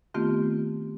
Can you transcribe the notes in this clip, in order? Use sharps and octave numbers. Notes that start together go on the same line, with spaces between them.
D#3 A3 B3 C4 F4 G4